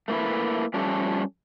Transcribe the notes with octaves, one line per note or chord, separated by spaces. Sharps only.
A3 A#3 E4 B4
F3 G3 A3 C#4 G4 A4